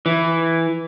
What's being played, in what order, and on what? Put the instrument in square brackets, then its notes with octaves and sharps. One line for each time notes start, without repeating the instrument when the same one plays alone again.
[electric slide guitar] E3